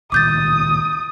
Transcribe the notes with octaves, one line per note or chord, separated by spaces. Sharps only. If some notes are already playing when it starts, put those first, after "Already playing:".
C#2 A#2 D#3 D6 D#6 G6 A6